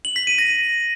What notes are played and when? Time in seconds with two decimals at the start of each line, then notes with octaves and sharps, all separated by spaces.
0.05 F#7
0.16 B6
0.27 D#7
0.38 A#6